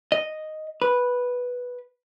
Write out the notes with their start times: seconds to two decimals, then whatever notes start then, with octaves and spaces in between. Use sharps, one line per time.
0.12 D#5
0.82 B4